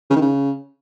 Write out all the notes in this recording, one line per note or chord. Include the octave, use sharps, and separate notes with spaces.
C#3
D#3
C#3